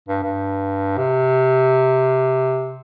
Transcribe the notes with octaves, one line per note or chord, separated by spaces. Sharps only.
G2
G2
C3